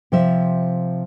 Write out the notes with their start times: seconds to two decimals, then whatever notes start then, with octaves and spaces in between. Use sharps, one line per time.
0.12 C3 F3 E5